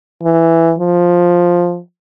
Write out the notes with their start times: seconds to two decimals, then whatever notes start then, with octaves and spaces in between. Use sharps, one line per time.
0.23 E3
0.79 F3